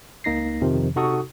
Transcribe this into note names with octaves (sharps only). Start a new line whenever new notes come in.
C#2 A#3 D#4 A#6 C7
F2 C3 D#3 F3
C3 D#4 F#4 A4 C#6 D#6